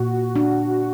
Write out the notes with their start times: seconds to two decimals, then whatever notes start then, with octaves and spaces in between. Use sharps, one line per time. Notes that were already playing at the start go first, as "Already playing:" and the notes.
Already playing: A#2 F#4
0.36 D4